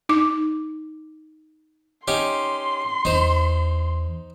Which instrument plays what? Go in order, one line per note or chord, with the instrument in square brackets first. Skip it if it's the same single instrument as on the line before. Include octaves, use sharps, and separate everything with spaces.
[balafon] D#4 D6
[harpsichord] C#4 D#4 G4 [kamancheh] C6
[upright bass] E2 [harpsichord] D#4 C5